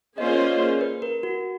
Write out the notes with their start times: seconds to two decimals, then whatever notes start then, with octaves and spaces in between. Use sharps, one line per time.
0.18 A#3 C#4 F4 G#4 C5 D#5
0.26 D5
0.33 C#5
0.41 D5
0.81 B4
1.02 A#4
1.23 F#4